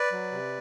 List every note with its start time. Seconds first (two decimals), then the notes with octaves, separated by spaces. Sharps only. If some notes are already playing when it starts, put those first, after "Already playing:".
Already playing: B4 D5
0.12 F#3
0.32 C3